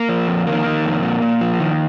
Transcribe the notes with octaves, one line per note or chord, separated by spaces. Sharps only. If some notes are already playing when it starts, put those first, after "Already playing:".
Already playing: A#3
F3
F2
D#3 A#3
D#3
F2
A#2
A#2
F3
D#3